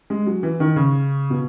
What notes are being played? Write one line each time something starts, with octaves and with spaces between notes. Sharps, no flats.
G#3
F#3
E3
D#3
C#3
B2